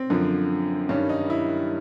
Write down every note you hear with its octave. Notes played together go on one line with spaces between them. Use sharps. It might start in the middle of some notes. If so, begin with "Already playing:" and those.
Already playing: C4
F#2 D3 F3
G2 D#3 G3 C#4
D#4
E4